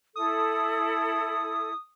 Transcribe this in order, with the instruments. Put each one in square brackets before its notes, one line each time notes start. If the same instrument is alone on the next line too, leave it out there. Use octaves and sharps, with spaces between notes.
[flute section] E4 A4 [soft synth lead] D#6